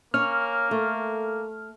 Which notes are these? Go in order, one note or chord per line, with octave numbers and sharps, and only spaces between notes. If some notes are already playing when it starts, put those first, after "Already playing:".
A#3 C#4 F6
A3